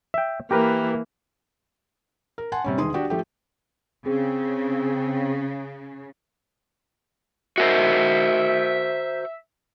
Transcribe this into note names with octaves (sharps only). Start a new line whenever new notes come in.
E5 G5
E3 A#3 G4 A#4 B4
A#4
F#5 G#5 A5 C6
C3 G3 C#4
E1 D#3 G#4 C6 D#6
D4 F#4 G4 D5
F3 A3 G4
C#3 C4 G#4
F#4 A#4 C5 E5